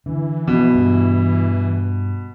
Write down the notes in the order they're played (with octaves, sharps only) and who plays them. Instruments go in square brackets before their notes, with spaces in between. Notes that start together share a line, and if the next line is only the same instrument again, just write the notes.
[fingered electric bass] D3 [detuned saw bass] E3
[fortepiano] B2 [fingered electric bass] F3
[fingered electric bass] G2